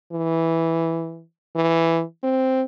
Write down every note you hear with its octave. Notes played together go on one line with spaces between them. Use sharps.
E3
E3
C4